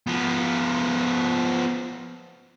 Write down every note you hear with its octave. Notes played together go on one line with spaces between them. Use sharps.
F3 B3